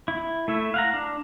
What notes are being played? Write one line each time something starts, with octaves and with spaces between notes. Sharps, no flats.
E4
A3 E4 E5
F5 F#5 A#5
D4